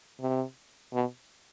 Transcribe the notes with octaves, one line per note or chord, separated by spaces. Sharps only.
C3
B2